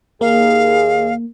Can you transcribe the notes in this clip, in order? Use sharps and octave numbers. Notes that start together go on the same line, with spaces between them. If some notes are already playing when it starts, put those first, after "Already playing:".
D#2 A#3 G#4 F5